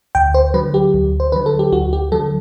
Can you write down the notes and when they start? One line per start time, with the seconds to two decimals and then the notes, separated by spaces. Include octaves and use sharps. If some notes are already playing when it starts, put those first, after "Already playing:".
0.15 D2 G5
0.34 C5
0.54 D3 F#3 B4
0.74 G4
0.94 D2
1.20 C5
1.32 D3 F#3 B4
1.46 A4
1.59 G4
1.72 D2 F#4
1.93 G4
2.12 D3 F#3 A4